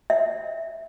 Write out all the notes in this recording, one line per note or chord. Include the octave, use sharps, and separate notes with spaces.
E5